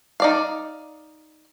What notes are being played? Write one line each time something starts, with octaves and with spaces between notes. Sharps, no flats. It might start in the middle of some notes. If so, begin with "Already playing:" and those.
D#4 D5 F5